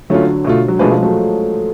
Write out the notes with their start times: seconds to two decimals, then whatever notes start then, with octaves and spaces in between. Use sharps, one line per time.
0.10 D3 F#3 A3 C#4 F4
0.45 B2 A3 F4
0.68 F#3
0.79 B2 F3 G#3 A3 D4 G#4 B4
0.91 F3 G#3
1.03 F#3 A3